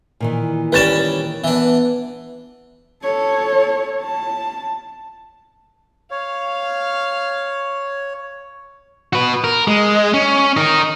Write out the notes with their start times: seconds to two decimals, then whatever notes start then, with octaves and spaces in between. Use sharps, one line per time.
0.20 A#2 D#3 E3
0.72 G3 C#4 B4 D5 A6 E7
1.44 E3 B3 D4
3.03 A4 C#5
4.02 A5
6.11 C#5 F5
9.13 F#4 B4
9.44 A#4
9.67 G#3
10.14 C#4
10.57 D#4 A#4